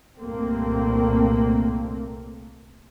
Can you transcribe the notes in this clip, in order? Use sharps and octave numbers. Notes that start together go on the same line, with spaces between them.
C2 G2 A#2 A3 A#3 C4